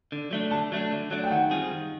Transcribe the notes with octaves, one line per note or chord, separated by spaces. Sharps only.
D3
F#3 A3 D4
D3 A5
F#3 A3 D4
D3
F#3 A3 D4
G5
D#3 F#5
G3 C4 F4 G#4
D#3